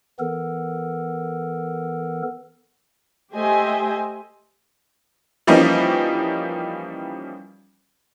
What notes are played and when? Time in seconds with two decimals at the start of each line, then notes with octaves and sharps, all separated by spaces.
0.19 E3 B3 A4 A#4
3.34 A3 G4 C5 D#5 E5 G#5
5.47 E3 F3 G3 A#3 C#4 D#4